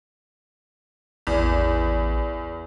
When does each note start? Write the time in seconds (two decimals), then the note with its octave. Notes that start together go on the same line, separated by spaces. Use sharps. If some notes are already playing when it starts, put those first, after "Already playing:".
1.27 A1 E2